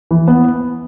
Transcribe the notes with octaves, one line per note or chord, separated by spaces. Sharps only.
E3
B3